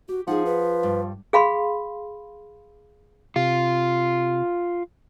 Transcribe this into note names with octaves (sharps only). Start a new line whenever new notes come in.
F#4 G4
F3 D#4 G#4 F#5
B4
G2
G#4 F5 B5 C6
C3 F4